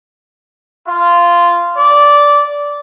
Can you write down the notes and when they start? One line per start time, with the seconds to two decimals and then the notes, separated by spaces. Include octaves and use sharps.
0.86 F4
1.77 D5